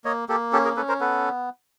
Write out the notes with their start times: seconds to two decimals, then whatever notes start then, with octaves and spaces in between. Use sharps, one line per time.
0.05 A#3 C#5 D#5
0.29 A#3 G4 A4
0.53 C#4 G4 A4
0.65 G#4 A#4
0.76 C#4 A4 B4
0.88 A#4 C5
1.00 B3 A4 B4